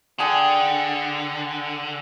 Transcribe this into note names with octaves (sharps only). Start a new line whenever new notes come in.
D3 D4 G#4 G5